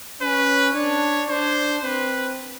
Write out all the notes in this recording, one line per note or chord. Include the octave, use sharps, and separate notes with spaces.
C#4 B4
D4 C#5
D4 C5
C4 B4